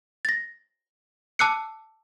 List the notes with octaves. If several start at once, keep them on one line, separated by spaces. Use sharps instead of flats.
A6 A#6
A5 D6 E6 F#6 C7 C#7